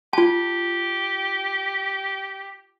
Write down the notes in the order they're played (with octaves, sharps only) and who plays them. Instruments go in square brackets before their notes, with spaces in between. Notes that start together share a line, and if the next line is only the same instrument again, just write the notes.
[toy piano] F4 A5 [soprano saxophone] G4